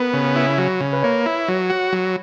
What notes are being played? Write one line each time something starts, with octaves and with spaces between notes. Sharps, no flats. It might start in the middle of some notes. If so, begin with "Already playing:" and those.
Already playing: B3 A#4 B4
C#3
E4
F#3
C#3
B4
A#3 C#5
E4
F#3
F#4
F#3